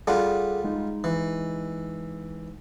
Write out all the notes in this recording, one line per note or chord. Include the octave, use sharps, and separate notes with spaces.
G3 D4 F4 G#4 A4 F#5
G#3 D#4
E3